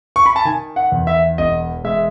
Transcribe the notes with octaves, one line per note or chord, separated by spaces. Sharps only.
C#6
B5
A5
D#3 G#5
F#5
E2
E5
E1 D#5
G#3 E5